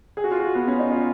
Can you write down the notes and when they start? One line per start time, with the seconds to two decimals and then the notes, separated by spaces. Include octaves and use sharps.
0.17 G#4
0.24 F#4
0.31 F4
0.40 F#4
0.55 B3
0.68 C#4
0.79 D#4
0.92 F4